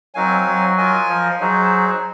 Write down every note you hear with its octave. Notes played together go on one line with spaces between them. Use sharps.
F#3 C4 D#4 A#4 F5 G#5
F#3
F4 A#4 D#5 G#5
F3
F#3 D#4 G#4 C5